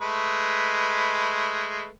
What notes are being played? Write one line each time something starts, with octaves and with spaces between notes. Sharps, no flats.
G#3 A3 B4